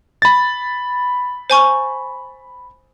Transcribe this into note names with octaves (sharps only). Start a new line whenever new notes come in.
B5 A6
C5 G#5 C#6